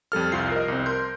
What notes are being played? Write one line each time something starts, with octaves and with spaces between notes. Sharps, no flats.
F2 G3 A4 F6
C2 F2 F4 C7
A#4 D#5
C2 C4
A#4 C6 G6